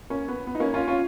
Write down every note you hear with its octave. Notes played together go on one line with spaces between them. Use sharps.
A#3 C#4
B3
B3
D#4
A#3 C#4
C#4 F4
C#4 F4